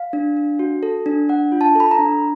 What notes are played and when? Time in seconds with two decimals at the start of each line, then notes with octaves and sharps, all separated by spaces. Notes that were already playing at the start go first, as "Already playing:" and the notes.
Already playing: F5
0.13 D4
0.37 D4
0.59 F#4
0.83 A4
1.06 D4
1.29 D4 F#5
1.52 F4
1.61 A5
1.75 A4 B5
1.91 A#5
1.99 D4